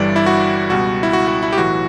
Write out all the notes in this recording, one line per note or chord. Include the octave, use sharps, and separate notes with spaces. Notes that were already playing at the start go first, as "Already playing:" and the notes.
Already playing: G1 G2 E3 G3 D5
E4
F#4
C#2 B2 G3 F#4
E4
F#4
F#4
E4
G4
B1 A2 E3 F#4